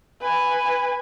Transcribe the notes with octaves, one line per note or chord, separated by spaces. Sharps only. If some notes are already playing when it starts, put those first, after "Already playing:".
B4 G#5